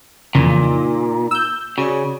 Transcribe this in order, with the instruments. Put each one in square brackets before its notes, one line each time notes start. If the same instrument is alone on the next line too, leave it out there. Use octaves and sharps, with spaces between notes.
[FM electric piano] F2 E3 F3 [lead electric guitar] A#2 [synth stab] C#3
[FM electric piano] D#4
[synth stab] E6 G6
[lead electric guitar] C#3 [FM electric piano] F#4 C#5 D5